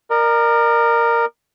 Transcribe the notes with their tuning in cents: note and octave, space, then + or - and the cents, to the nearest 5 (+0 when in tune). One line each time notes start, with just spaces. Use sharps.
A#4 +0 D5 +45